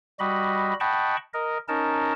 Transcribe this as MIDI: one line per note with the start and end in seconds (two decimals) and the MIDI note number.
0.20 0.74 55
0.20 0.74 66
0.20 0.74 75
0.20 0.74 83
0.80 1.16 75
0.80 1.16 78
0.80 1.16 79
0.80 1.16 81
0.80 1.16 83
0.80 1.16 85
1.34 1.58 70
1.34 1.58 75
1.68 2.13 61
1.68 2.13 63
1.68 2.13 70
1.68 2.13 81